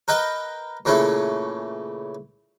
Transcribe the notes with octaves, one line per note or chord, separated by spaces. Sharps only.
A#4 B4 D#5 G5
A#2 C#3 E3 A3 C#4 E4